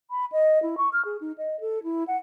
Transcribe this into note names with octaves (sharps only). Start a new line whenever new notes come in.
B5
D#5
E4
C#6
F6
G#4
D#4
D#5
A4
E4
F#5